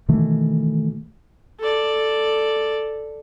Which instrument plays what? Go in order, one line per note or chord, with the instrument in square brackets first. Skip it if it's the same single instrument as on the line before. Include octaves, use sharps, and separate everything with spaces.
[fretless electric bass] B2 D#3 E3 A3
[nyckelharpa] A4 D5